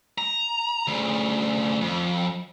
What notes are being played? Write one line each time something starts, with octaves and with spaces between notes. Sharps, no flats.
A#5
D2 C#3
F2